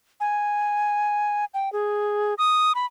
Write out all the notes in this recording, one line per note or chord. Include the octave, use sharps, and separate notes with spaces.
G#5
G5
G#4
D#6
B5